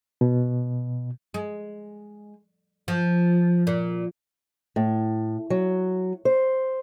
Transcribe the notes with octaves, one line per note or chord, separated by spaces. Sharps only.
B2
G#3
F3
A#2
A2
F#3
C5